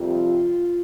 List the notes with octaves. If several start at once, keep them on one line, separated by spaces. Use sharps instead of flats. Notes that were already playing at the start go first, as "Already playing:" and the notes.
Already playing: F2 C3 G3 F4